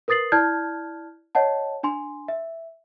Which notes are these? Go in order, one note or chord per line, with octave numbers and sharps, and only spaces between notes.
A#4 B4 D#6 A6 C7 F#7
E4 D5 A5 F6 G6 G#6
C#5 D#5 F#5 A5
D4 G#5 C6
E5